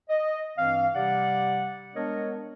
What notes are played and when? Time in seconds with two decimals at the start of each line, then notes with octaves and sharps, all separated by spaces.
0.09 D#5
0.57 G2 E3 C4 F5
0.95 C3 G3 G4 D5 F#5
1.94 G#3 B3 D4 A#4 C#5 D#5